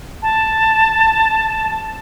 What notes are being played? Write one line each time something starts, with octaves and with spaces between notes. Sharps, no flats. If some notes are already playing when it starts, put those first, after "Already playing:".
A5